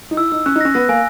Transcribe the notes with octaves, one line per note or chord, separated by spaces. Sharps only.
D#4
E4 E6
D#4 E6
C#4 F#6
D#4
C#4 A#6
B3 A#6
A#3 G#5